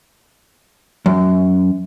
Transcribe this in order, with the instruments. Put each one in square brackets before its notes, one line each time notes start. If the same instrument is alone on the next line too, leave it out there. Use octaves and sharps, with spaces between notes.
[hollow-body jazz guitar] F#2